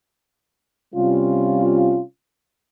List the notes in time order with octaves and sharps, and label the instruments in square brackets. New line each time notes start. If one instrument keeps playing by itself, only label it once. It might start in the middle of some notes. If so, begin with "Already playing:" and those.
[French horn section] C3 G3 C#4 F4